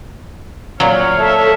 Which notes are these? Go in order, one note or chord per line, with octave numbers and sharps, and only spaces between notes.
A#2 F#3 C#5 F5
A4 E5